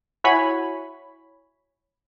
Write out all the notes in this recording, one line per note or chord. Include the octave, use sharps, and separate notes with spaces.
E4 F#4 C#5 G#5 B5